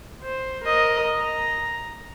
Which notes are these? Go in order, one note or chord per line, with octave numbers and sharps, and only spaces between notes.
C5
A#4 D#5
A#5